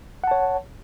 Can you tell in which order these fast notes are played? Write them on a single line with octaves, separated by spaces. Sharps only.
F#5 A5 C#5